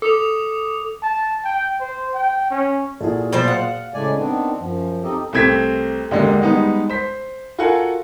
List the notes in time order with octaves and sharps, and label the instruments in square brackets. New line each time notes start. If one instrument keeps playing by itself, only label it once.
[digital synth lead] A4 [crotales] D6 D#6 F7
[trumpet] A5
G5
C5
G5
C#4
[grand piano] A#2 F#4 G#4 [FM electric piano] E4 A4
[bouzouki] B2 C5 A5 [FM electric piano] F#3 D5
[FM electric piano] F5 [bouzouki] F#5
[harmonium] A2 C#3 G#3 A3 D5 G#5
D#3 B3 C4 D4
F#2 F3
C4 D#4 G4 A4 D#5
[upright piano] C2 A3 C4 G#6 B6
D#2 D3 G#3 A#3
G3 G#3 B3 D#4
C5 B6
F4 F#4 A4 A#4 F#5 G#5